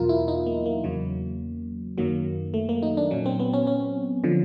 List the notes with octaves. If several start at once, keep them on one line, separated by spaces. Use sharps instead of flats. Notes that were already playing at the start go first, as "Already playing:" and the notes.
Already playing: E2 B2 F#3 F4 A#4
E4
D#4
A#3
A#3
E2 C#3 F#3
F#2 D#3 F#3 A#3
A3
A#3
D#4
D4
A#2 F#3 C#4
C4
B3
C#4
C#4
D3 F3